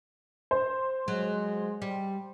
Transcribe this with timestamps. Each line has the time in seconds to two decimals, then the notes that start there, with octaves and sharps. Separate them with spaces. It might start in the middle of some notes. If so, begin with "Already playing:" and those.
0.51 C5
1.08 F#3 G#3
1.82 G3